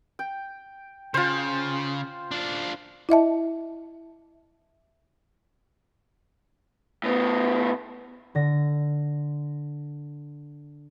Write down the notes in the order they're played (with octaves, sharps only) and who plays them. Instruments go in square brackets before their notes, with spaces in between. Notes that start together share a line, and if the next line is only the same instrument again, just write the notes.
[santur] G5
[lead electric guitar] C#3 [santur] F4 C5
[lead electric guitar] D4 F4
[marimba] E4 D#5 E5 A5
[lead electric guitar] A2 B3
[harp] D3 A#6